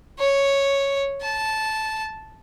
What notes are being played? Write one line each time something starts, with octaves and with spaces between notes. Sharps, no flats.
C#5
A5